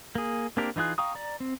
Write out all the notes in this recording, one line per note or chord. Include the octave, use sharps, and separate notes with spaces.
A#3 G#4
A#3 C4 D4 G4 A#4
E3 D#4 F4 G#4 F#6
F5 G5 A#5 C#6 D#6
D5 A#5
C4